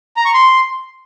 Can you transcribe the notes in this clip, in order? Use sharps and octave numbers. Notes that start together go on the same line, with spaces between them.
A#5
C#6
C6